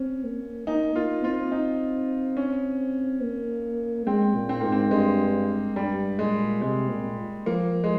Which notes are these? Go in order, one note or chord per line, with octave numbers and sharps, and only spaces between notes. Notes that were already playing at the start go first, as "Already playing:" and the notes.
Already playing: C4 C#4
A#3
A#3 D#4
A#3 F4
C4 F4
D#4
C#4
A#3
G#3 C4
A#2
C4
G#2 A#3
C4
G2 G#3
G2 G3
A#2 G#3
C3 G#3
A#2
F3 A#3
G#3